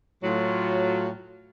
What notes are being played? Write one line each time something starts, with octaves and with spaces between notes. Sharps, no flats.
A2 F#3 F4